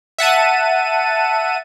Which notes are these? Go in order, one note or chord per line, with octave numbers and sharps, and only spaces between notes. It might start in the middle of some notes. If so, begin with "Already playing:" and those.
E5 F#5 A5 D#7